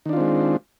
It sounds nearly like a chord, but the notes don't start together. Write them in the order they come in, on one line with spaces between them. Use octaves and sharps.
D#3 D4 F4 C4 G#3